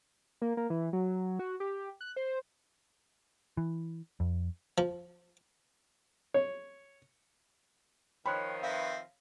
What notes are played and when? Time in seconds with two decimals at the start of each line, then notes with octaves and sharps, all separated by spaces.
0.42 A#3
0.57 A#3
0.70 E3
0.93 F#3
1.39 F#4
1.60 G4
2.01 F#6
2.16 C5
3.57 E3
4.20 F2
4.78 F3
6.34 C#5
8.26 D#3 F3 C#5 G5 B5 C6 F#6
8.63 C4 B4 E5 F5 A#6